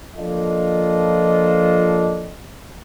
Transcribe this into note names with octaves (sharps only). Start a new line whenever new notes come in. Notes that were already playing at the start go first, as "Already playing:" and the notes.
F3 A#3 D4 F4 A4 D#5